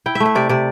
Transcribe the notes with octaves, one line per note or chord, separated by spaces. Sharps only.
E4 G5
E5
A3
E5
C3 D5
C3 D5